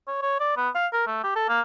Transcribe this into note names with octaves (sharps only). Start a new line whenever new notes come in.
C#5
C#5
D5
B3
F5
A#4
A3
G4
A4
A#3